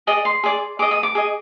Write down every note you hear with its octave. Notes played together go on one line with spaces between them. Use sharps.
G#4 D5 D#5
C6
G#4 D5
G#4 D#5 D6
D#6
D6
G#4 D#5